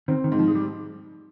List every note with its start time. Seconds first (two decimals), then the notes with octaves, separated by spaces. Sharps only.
0.08 D#3 C4
0.24 D#3
0.32 G#2
0.39 F3
0.48 G#3
0.55 G3